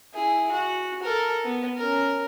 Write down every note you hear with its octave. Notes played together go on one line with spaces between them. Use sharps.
E4 G#4
F#4
A4 A#4
B3
C#4 A#4